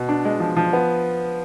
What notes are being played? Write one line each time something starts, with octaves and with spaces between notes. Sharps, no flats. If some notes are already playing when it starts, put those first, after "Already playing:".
Already playing: B2
D4
G#3
F3
F3
B3